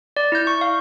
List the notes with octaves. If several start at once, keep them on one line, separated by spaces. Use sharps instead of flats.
D5
E4 G6
C#6
F5